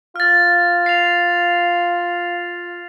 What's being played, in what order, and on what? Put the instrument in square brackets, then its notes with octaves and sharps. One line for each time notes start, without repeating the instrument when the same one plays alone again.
[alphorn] F4 [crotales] F6 A6
[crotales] C7 F7